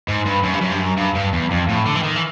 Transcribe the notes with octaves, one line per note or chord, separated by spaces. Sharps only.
G#2
G2
F#2
G2
F#2
G2
F#2
G2
G2
E2
F2
A2
D3
E3
D#3
E3